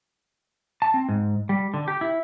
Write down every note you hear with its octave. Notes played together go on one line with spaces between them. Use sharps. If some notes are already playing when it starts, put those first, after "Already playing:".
A5
C4
G#2
G3
D3
G4
E4